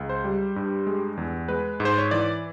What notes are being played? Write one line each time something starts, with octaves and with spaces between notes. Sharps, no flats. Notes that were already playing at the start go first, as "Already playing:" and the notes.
Already playing: C#2
C5
G3
G2
G#3
E2
G#3 B4
G#2
C5
C#5
E3 D5